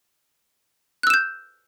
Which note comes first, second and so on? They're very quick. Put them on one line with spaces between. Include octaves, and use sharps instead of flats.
F#6 E6 E7 G6